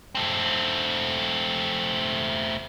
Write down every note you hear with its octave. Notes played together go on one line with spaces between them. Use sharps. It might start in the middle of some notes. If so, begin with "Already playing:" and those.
A3 C4